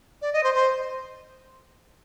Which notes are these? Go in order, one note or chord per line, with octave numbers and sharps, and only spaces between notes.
D5
D#5
C5
C5